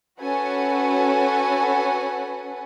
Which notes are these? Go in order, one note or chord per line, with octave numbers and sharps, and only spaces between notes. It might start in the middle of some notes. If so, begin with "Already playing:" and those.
C#4 F#4 A4 B4 F#5 G#5